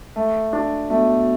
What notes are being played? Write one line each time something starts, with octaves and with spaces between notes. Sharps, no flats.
A3
D4
B2 A3